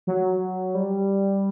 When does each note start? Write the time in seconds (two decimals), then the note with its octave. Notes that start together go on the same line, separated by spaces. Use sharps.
0.07 F#3
0.75 G3